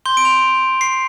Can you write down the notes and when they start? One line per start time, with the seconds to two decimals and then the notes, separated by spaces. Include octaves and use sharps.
0.06 C6 G6 G7
0.17 D7
0.25 F7
0.81 C7